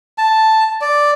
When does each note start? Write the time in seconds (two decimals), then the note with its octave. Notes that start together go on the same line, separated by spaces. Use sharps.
0.18 A5
0.81 D5